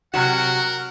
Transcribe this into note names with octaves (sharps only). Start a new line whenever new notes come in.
C3 F#3 F#4 A#4 F#5